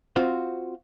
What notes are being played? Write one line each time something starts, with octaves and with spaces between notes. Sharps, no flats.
C4 F4 F#4 C5